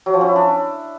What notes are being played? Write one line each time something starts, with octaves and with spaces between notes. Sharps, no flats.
F#3
F3
C#4
E4
D4